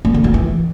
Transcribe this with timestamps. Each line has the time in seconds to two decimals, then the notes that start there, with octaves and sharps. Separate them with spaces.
0.05 A#3
0.14 D3
0.24 F#3
0.34 E3